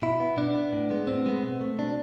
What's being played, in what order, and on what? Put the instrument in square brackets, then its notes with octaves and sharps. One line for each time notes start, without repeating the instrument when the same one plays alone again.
[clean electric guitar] B2 E4
B3
B2 D4
B3
A2
G#3 B3
A2 C4
G#3 B3
B2
A3
B2 D4